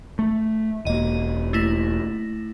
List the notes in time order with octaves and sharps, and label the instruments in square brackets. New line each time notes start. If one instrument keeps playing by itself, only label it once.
[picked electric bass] A3
[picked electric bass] E1 A#3 [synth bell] D#5 D#7
[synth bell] A3 E4 A#6